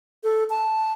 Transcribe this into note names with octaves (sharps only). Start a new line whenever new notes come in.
A4
A5